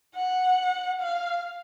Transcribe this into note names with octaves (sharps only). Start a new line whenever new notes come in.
F#5
F5